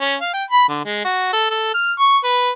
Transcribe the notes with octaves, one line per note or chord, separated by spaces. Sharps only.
C#4
F5
G5
B5
D3
G#3
F#4
A4
A4
F6
C#6
B4